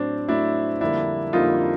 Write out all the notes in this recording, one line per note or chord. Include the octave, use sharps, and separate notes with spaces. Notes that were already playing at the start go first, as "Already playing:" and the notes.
Already playing: A2 F#3 A3 C4 D4
A2 F#3 A3 D4 E4
F2 D3 G3 A#3 D4 E4
F2 D3 G3 A#3 D#4 F4